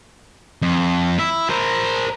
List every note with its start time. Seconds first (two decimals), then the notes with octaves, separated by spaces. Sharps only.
0.62 F2
1.19 E4
1.50 A#4 C5